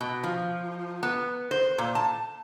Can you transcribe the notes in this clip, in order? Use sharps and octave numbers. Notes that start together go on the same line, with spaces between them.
B2
F3
B3
C5
A#2
A5